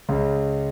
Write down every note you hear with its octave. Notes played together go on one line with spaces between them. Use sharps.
C#2 C#3